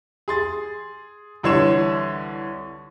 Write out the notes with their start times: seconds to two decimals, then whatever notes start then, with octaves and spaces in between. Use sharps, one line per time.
0.28 G#4 C6 A6
1.43 C2 D3 E3 C#5 C6 E7